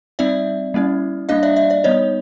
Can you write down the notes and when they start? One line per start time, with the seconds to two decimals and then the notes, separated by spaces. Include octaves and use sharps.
0.19 G3 C4 D#4 D5 E5
0.74 G3 A#3 C#4 E4
1.29 G3 A#3 D4 D#5 F5
1.43 D5 E5
1.56 D5 E5
1.70 D5 E5
1.84 G3 B3 D#4 C#5 D#5